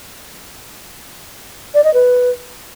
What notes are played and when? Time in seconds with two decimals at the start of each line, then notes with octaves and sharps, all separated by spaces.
1.74 D5
1.84 D#5
1.94 B4